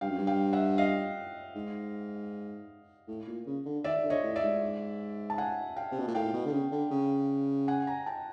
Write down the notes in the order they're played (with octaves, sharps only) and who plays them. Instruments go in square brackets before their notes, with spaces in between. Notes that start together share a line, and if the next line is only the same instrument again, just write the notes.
[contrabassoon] G2 [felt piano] F5 G5
[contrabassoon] F#2
G2
[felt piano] F5 G5
E5 F#5
D#5 F5
[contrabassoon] G#2
A2
A#2
C#3
D3
[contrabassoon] D#3 [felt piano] D5 E5
[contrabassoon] D3
[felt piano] C#5 D#5
[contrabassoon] A2
[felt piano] D5 E5
[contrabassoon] G#2
[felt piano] A5
F#5 G#5
F5 G5
[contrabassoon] C3
B2
A#2
[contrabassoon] A2 [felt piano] F5 G5
[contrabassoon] B2
D3
C#3
D3
C#3
[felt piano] F#5 G#5
G#5 A#5
G5 A5